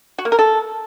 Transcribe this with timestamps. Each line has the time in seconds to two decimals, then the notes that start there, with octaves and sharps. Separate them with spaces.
0.18 F#4
0.25 A#3
0.32 A#4
0.39 A4